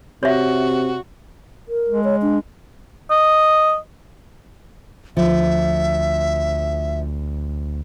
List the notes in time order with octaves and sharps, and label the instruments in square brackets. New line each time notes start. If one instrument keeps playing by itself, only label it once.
[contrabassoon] C3 [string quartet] F#4 [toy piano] C#5 E5
[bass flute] A#4
[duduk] G#3
[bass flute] C#5
D4
[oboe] D#5
[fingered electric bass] D2 [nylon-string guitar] F3 [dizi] E5